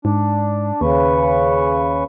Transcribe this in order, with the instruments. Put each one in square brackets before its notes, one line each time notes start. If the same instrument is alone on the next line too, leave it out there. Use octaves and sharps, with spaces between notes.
[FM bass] G#2 [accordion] D4
[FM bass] D#2 [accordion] C#3 B4 C#6